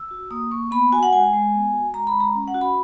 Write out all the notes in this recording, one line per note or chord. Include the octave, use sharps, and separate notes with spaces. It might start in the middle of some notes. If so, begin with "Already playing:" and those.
Already playing: E6
F#4
A#3 D#6
A#3 C#6
B3 B5
F#4 G#5
F#5
G#3 G#5
G#3
B3
F#4
G#3 A#5
B5
G#3
A#5
C#4
F#5
F#4
B5